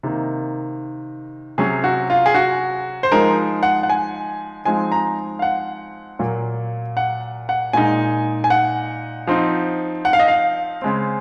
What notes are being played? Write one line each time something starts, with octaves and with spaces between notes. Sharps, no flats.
C3 D#3 A#3 D#4
C3 F#3 C#4 G#4
F#4
F4
G#4
F#4
C5
F3 G#3 D#4 A#4
F#5
F#5
G#5
F3 G#3 C4 D#4 G#5
A#5
F5
F#5
A#2 F#3 A#3
F#5
F#5
A#2 G#3 D#4 G#5
G#5
F#5
F3 C4 D#4
F#5
F5
D#5
F5
C#3 G#3 C4